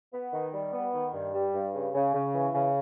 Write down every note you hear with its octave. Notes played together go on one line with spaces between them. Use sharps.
B3
D#3
G3
B3
D#3
G2
G3
G2
C#3
C#3
C#3
E3
C#3